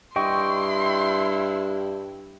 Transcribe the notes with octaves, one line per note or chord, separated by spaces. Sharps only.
G2 E4 D#5 G5 C6 C#6